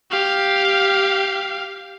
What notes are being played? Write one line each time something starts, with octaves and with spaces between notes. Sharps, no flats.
G4 F5